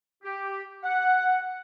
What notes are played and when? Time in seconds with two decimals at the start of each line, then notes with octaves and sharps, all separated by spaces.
0.23 G4
0.84 F#5